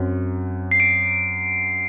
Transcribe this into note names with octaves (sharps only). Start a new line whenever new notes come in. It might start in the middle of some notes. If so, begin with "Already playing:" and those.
Already playing: F#2 F#3 C4
C7
D7